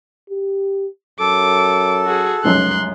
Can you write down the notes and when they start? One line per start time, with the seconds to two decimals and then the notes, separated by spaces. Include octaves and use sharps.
0.30 G4
1.20 F#2 A4 D6
2.06 F#4 G#4
2.44 F1 C#2 F#2 C6 F#6